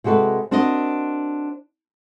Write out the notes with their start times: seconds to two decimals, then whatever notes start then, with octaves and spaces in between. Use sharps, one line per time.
0.04 C3 G#3 F#4 A4 B4
0.51 C4 D4 F#4 A#4 D#5